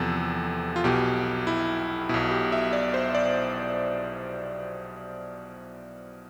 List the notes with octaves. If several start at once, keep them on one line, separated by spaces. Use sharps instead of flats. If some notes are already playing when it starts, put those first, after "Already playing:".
Already playing: E2 C3 F3 A4
F4
B1 B2 G4
E4
B1 B2 E4
G4
E5
D5
C5
D5